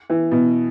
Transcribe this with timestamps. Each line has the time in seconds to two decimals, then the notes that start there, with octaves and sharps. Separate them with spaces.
0.10 E3
0.31 B2